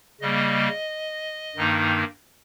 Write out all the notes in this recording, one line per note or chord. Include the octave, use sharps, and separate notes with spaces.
C#3 G3 A#3 D#5
G2 D#3 A#3 D#4